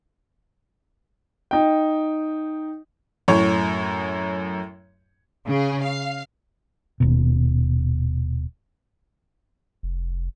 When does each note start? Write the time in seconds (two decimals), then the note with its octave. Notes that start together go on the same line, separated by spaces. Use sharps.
1.51 D#4 G5
3.28 F#2 A2 C#5
5.47 C#3 G#4
5.82 F5
7.00 D#1 B2
9.83 F1